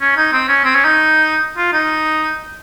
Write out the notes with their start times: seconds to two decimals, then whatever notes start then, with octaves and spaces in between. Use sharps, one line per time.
0.01 C#4
0.17 D#4
0.33 C4
0.48 C#4
0.64 C4
0.75 C#4
0.85 D#4
1.57 F4
1.73 D#4